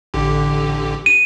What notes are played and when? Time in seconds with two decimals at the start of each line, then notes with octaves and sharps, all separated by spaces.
0.14 A1 D3 G4
1.06 D#7